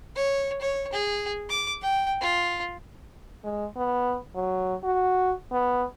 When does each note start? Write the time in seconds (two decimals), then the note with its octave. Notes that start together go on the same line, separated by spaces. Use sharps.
0.16 C#5
0.61 C#5
0.93 G#4
1.50 D6
1.82 G5
2.21 F4
3.44 G#3
3.76 B3
4.35 F#3
4.84 F#4
5.52 B3